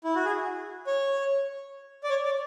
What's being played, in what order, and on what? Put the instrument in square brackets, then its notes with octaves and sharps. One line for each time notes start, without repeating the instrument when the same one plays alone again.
[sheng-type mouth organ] E4
F#4
G#4
C#5
D5
C#5
D5